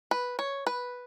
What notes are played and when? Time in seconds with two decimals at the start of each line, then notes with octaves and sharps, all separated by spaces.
0.11 B4
0.39 C#5
0.67 B4